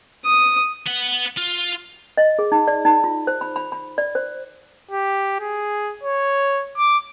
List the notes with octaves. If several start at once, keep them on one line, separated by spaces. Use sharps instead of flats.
D#6
B3 F#5
F4
D#5
G#4
D#4
D5
D#4
F4
C5
B5
B5
B5
D5
C5
G4
G#4
C#5
D6